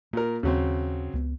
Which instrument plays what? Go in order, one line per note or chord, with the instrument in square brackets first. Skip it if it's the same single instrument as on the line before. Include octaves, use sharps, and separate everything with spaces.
[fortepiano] A#2 A#4 [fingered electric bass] A#3
[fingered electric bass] D#2 [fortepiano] C#3 F#3 C4
[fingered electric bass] C#2 B3